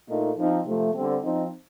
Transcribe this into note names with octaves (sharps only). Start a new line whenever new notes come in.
A#2 A3 D#4
F3 C4 D#4
C3 F3 A3
D3 G3 C4
F3 C4 D#4